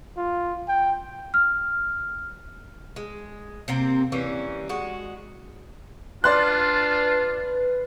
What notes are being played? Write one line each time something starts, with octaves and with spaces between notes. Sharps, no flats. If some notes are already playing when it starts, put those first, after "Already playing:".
F4
G5
F6
G#3
C3 A#3 C4
E3 G3 A#3 C#4
G#3 F#4
D4 F4 B4 D5 C6 F#6